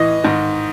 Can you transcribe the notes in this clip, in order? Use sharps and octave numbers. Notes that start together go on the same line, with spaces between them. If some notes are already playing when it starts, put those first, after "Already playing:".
Already playing: A2 E3 D#5
G#2 D#3